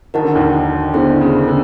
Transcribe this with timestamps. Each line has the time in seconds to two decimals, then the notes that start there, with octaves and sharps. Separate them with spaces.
0.14 D#3 F#4 A#4 D#5 F#5 A5
0.24 D3
0.35 D#2 D#3
0.94 D3 B3 E4 G#4 C5
1.21 C#3
1.48 D3